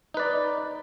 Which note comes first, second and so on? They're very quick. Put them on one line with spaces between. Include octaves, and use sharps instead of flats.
D#4 B4 D5